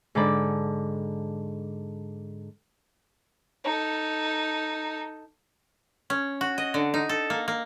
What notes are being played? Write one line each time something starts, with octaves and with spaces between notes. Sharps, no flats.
G#2 D3 D#4 D5 B5
D#4 A4
C#4
F#4
D#5
D3
D#4
A4
A#3
A#3